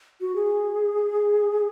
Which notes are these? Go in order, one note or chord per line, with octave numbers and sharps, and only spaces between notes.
F#4
G#4